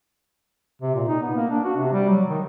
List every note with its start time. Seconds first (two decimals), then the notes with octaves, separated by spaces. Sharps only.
0.82 C3
0.95 A#2
1.08 D#4
1.22 B3
1.36 A#3
1.50 D4
1.64 F#4
1.76 C3
1.93 G3
2.09 F#3
2.30 D#3